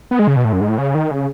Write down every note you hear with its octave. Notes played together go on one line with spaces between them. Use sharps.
B3
G#3
C#3
B2
A2
F#2
G#2
A2
C#3
D#3
C#3